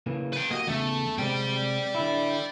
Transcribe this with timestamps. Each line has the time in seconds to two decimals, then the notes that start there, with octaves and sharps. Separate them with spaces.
0.06 C#3 E3 A#3
0.33 B4 G5
0.51 A#3 F#4 G4 D#5
0.68 E2 C#3 A3
1.18 C3 G#3 C4 D5 G5
1.95 D3 E4